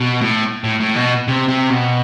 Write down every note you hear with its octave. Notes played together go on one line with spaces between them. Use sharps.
B2
A2
A2
A2
B2
C3
C3
B2